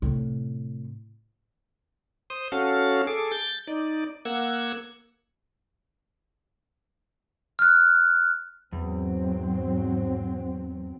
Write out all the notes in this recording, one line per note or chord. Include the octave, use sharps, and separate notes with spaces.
A2 C3
C5 D#6
C#4 F#4 A4 F5
G#4 A4 D6
G6 A6
D#4 D5
A#3 F#5 E6 G#6
F6 F#6
E2 G#2 F#3 C4